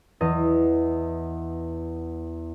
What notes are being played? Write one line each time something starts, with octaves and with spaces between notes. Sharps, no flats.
E2 D#5